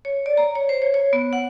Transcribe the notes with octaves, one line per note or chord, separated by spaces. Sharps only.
C#5
D5
A#5
C#5
C5
C#5
C#5
B3
F#5